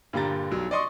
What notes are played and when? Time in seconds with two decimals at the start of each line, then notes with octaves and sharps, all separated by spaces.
0.13 G2 A#2 D3 G4 A#5 A6
0.51 B1 F#3 G3
0.71 D5 D#5 C6 C#6 D#6